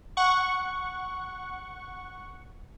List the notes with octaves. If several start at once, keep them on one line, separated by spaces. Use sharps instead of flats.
F#5 C#6